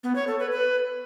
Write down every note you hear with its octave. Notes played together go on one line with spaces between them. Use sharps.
B3
C#5
A4
B4
B4